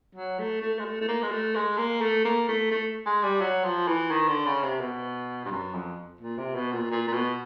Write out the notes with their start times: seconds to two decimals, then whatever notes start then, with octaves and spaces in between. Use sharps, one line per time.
0.15 F#3
0.39 A3
0.62 A3
0.79 G#3
0.85 A3
1.01 A3
1.08 A#3
1.23 G#3
1.31 A3
1.55 G#3
1.78 A#3
2.01 A3
2.25 A#3
2.48 A3
2.71 A3
3.06 G#3
3.23 G3
3.41 F#3
3.64 F3
3.88 E3
4.11 D#3
4.28 D3
4.46 C#3
4.63 C3
4.80 B2
5.45 G2
5.51 F#2
5.74 F2
6.21 A#2
6.38 C3
6.55 B2
6.73 A#2
6.91 A#2
7.07 A#2
7.13 B2